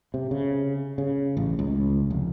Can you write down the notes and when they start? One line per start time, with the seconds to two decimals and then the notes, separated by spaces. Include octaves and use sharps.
0.14 C3
0.31 C#3
0.98 C#3
1.37 A1
1.59 C#2
2.11 F1